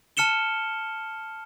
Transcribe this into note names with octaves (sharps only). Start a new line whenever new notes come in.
A5 F6 C#7 E7 G7